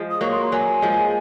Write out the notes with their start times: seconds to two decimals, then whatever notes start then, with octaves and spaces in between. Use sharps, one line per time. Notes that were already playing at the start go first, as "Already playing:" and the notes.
Already playing: F3 G#3
0.11 D#6
0.21 F#3 A#3 C#6
0.31 C6
0.42 A#5
0.52 F#3 A#3 G#5
0.82 F3 G#3